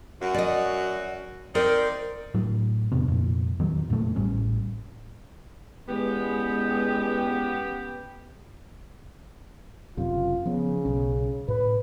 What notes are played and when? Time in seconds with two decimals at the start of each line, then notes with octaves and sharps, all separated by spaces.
0.22 F#2 F#4
0.34 D5 D#5
1.55 C4 D#4 A#4 D5
2.34 A2 F#3
2.92 E2 C3 B3
3.08 F2 A#2
3.59 E2 D#3 F#3
3.90 F1 F#2 A#2 A3
4.16 A1 A2 G3 C#4
5.88 E2 G#3 B3 C#4 G4 B4
9.97 F#1 F#2 C3 F4
10.46 C#3 F3 B3
10.85 B1 C#4
11.48 A2 B4